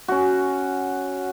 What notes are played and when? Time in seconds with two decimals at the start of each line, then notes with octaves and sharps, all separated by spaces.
0.08 C#4 F#4